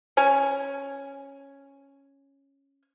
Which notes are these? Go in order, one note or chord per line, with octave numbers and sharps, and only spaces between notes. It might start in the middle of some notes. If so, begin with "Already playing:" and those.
C#4 G#5